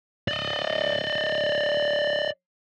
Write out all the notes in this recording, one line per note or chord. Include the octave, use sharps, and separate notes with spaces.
D5 D#5